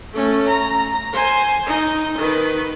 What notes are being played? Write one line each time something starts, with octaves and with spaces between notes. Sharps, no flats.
A3 C#4
A#5
C5 G#5
D#4
D#3 B4